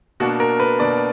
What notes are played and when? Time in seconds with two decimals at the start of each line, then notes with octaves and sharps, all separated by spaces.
0.20 B2 A#3 D4 F#4
0.40 A#4
0.60 B4
0.79 B2 A#3 D4 D5